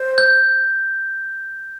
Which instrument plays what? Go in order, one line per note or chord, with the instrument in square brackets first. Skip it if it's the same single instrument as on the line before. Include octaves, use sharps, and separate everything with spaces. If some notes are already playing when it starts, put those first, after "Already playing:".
Already playing: [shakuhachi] C5
[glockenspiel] G6